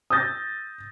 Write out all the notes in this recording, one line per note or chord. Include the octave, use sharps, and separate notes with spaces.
D#6 E6 G6 A6 A#6